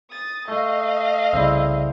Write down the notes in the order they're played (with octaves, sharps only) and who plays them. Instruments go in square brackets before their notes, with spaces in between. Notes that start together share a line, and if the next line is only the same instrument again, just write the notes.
[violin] D#6 A6
[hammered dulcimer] A3 [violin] D#5 F5
[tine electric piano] C2 C#3 D5 [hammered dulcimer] C4 E4